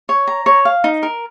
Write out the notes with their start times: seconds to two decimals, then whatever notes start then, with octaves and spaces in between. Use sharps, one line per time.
0.09 C#5
0.27 A#5
0.46 C#5
0.65 F5
0.84 D#4
1.03 A#4